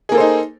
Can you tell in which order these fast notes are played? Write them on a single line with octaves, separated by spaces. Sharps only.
G#4 A#3 A4 C5 D#4